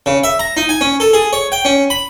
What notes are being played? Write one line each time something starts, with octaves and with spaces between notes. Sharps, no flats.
C#3
E5
A#5
D#4
G#5
C#4
A4
G#4
C#5
G5
C#4
B5